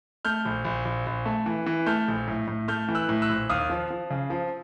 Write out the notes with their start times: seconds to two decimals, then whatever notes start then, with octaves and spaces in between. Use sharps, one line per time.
0.25 A3 F6 G6
0.45 A#1
0.65 A#1
0.85 A#1
1.06 A#1
1.25 A3
1.46 E3
1.66 E3
1.86 A3 F6 G6
2.08 A#1
2.27 A2
2.47 A2
2.68 A3 F6 G6
2.88 E3
2.95 E6 F#6
3.09 A2
3.22 E6 F#6
3.29 A#1
3.50 D#2 D#6 F6
3.70 F3
3.90 F3
4.10 C#3
4.30 F3